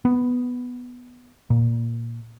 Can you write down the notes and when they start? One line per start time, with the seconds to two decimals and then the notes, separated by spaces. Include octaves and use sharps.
0.05 B3
1.50 A#2